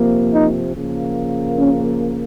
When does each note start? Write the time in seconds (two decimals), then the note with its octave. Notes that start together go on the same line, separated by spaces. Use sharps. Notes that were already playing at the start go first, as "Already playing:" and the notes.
Already playing: C3 F3 A#3
0.34 D#4
0.75 C#3 F3 A#3
1.57 C#4